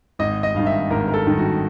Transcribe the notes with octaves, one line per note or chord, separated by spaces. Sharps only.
G#1 D#5
D#5
G2 D#3 F5
E5
G#1 A#4
A#4
A4
G2 D#3
F#4